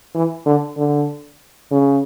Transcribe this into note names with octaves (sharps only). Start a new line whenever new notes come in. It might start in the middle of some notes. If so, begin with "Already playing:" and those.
E3
D3
D3
C#3